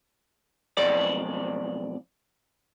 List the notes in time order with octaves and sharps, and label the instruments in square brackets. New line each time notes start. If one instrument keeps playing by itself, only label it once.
[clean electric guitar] B1 F2 D5